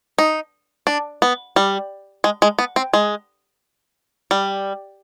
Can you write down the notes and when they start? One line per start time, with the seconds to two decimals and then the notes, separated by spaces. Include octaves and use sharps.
0.18 D#4
0.87 D4
1.22 B3
1.56 G3
2.24 G#3
2.42 G#3
2.59 B3
2.76 C4
2.93 G#3
4.31 G3